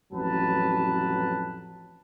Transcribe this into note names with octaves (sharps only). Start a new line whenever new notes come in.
A1 F2 F#3 B4 A5